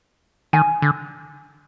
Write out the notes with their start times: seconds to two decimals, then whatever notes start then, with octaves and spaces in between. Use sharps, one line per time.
0.53 D#3 G#5
0.82 D3